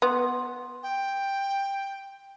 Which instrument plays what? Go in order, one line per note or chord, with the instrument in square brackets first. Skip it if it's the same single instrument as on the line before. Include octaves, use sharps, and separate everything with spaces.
[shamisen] B3 [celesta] C6
[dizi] G5